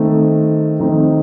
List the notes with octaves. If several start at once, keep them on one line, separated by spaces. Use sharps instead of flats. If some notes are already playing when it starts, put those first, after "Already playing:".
Already playing: D#3 A3 C4 D#4
D#3 A3 C4 D#4